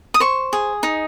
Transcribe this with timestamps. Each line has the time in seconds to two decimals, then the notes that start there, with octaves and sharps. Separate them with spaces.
0.14 D#6
0.20 C5 C#6
0.53 G#4
0.83 D#4